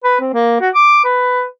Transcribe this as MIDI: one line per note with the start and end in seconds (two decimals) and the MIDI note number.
0.04 0.18 71
0.21 0.33 60
0.34 0.56 58
0.61 0.70 66
0.75 1.03 86
1.05 1.44 71